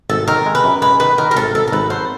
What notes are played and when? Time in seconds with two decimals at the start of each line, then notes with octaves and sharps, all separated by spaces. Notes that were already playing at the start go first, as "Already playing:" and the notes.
0.10 G#1 A4
0.28 D#3 A#4
0.46 G#3
0.55 B4
0.64 F#2
0.82 G#3 B4
1.00 D#3 B4
1.18 D#3 A#4
1.31 A#4
1.36 G#1 A4
1.54 G#1 A4
1.67 A#4
1.72 G#1 B4
1.90 F#3 C5